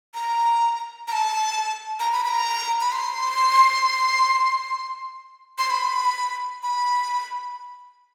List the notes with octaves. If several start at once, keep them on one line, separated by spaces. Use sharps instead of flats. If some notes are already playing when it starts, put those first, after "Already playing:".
A#5
A#5
A5
A#5
B5
B5
A#5
B5
C6
C6
B5
B5